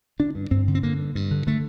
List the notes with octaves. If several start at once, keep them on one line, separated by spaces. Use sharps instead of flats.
D3 D4
G2
G2 C4
D3
C4
D3 A#3
G2
G2
D3
D3 A3